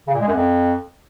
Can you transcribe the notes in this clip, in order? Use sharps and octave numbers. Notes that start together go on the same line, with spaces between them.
C#3
A#2
G#3
F#2
F2